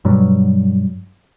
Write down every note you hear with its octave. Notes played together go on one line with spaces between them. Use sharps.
G2 B2 F#3 G3